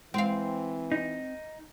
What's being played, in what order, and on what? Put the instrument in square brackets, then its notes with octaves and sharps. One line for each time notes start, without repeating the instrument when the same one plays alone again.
[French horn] E3 [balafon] G#3 [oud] C4 F5
[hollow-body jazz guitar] D#4